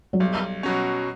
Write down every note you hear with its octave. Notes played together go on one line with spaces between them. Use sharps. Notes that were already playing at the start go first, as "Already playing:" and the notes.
F#3
B1 G3
B2 F#3 C#4